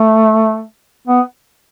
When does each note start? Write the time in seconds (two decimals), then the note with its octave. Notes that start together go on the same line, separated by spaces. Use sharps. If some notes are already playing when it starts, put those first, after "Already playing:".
Already playing: A3
1.07 B3